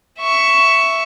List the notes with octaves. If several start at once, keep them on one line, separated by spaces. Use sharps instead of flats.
E5 C#6